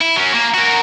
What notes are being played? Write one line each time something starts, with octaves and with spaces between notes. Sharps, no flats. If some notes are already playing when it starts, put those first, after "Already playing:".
E4
F#3 C#4
A#3
F#4 A#4